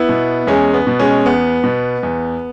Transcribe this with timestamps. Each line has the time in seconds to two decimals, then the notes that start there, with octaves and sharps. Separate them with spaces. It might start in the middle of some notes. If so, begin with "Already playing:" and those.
Already playing: B3 E4
0.09 B2
0.47 E2 G#3 C#4
0.74 B3
0.87 B2
0.99 G#3 C#4
1.25 E2 B3
1.64 B2
2.03 E2